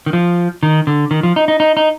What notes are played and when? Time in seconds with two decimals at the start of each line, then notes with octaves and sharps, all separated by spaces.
0.06 D#3
0.13 F3
0.63 D#3
0.87 D3
1.11 D#3
1.23 F3
1.36 D#4
1.48 D#4
1.60 D#4
1.77 D#4